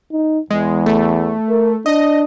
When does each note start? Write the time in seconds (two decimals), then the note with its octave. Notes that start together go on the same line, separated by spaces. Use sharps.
0.12 D#4
0.50 E2 G#3
0.86 A3
1.50 A#4
1.86 D4 D#5